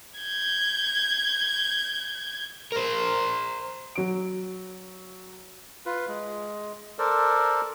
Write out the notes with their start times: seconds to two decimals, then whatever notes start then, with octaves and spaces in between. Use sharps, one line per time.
0.19 G6 G#6
2.72 A#4 C5
3.95 F#3 D7
5.86 F4 B4
6.08 G#3
6.99 A4 A#4 C5 D5